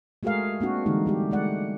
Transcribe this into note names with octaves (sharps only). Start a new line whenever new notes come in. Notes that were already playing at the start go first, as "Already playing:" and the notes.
G#3 A3 F#4 G#4 A#4 F5
A#3 C4 D4 F#4
D3 E3 G3 G#3 A#3 D#4
G3 A3 G4
G#3 A3 D5 F#5